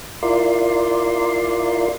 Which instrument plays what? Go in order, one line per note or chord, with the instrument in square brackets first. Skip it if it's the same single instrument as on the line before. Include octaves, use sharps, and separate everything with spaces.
[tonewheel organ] E4 F4 A#4 D5 C6